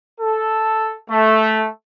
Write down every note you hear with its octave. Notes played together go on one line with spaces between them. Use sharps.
A4
A3